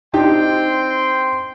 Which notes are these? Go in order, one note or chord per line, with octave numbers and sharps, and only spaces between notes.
C4 D4 D#4 G4 G5 C6